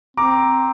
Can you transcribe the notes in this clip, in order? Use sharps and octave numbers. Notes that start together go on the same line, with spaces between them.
C4 A#5 D6